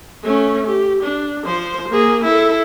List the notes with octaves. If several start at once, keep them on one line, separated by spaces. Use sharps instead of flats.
A3 C#4
G4
D4
F3 C5
A#3 G#4
E4 A4